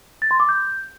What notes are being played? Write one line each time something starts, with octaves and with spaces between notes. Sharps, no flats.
A6
C6
D6
G6